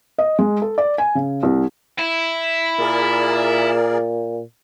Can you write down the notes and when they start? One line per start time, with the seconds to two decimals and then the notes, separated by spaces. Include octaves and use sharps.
0.18 D#5
0.39 G#3
0.62 A4
0.78 D5
0.98 G#5
1.15 C#3
1.43 C2
1.99 E4
2.79 A#2 G#4 A#4 D5